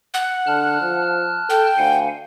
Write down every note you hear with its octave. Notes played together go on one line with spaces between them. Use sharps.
F#5
D3 A5 F6 F#6
F3
A4 G5
D2 F5 F#5 G#5